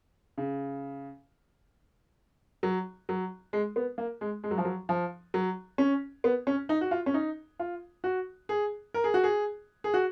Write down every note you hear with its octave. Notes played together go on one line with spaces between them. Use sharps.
C#3
F#3
F#3
G#3
B3
A#3
G#3
G#3
F#3
F3
F#3
F3
F#3
C#4
B3
C#4
D#4
F#4
F4
C#4
D#4
F4
F#4
G#4
A#4
G#4
F#4
G#4
G#4
F#4